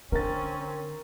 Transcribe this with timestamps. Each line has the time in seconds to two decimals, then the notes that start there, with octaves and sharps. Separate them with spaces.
0.12 D3 C4 C#4 A#4 A6